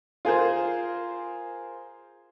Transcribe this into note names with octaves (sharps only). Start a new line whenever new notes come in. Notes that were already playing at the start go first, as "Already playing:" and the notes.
F4 G#4 A#4 C5